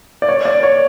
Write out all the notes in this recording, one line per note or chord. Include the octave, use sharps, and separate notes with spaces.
D5
C#5
D5
C#5